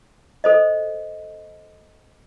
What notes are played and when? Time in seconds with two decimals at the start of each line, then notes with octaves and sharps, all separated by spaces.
0.44 A4 C5 D#5